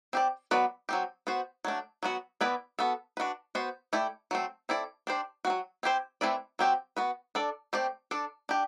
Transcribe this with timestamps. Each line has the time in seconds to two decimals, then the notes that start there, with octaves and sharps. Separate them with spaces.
0.13 C4 G4 D5
0.51 F#3 B3 F#4 B4 D5
0.89 F#3 C4 G4
1.27 B3 F#4 C5
1.65 F#3 A3 D4
2.03 F#3 B3 F#4
2.41 E3 B3 E4 B4 D5
2.79 B3 F#4 A4
3.17 D4 F#4 B4
3.55 B3 F#4 C5
3.93 A3 E4 G4 D5
4.31 F#3 A3 C4
4.69 C4 E4 A4 D5
5.07 D4 G4 C5
5.45 C4 F#4
5.50 F#3
5.83 C4 E4 G4 C5
6.21 A3 C4 E4 B4 D5
6.59 F#3 C4 G4
6.97 B3 F#4 B4
7.35 D4 A4 D5
7.73 A3 C4 G4 D5
8.11 D4 A4 D5
8.49 D4 G4